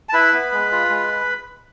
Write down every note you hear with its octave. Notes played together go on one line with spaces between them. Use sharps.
A5
E4 B4 B5
B3
G#3
F4
G#3